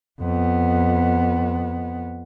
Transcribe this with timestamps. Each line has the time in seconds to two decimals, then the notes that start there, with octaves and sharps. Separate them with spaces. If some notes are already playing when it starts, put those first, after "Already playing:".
0.20 F2 B3